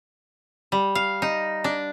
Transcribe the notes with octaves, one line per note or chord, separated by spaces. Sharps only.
G3
F5
D#4
D4